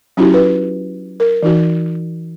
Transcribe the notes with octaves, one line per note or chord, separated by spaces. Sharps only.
F#3 C#4 D#4 E4 F#4 G4
B4
A#4
E3 D#4 F#4